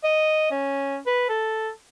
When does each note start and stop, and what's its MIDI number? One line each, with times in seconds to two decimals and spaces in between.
0.04 0.49 75
0.51 0.98 61
1.07 1.26 71
1.29 1.69 69